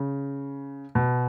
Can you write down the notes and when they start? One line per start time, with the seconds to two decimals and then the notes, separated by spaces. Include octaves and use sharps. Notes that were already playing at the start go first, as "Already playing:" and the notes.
Already playing: C#3
0.95 B2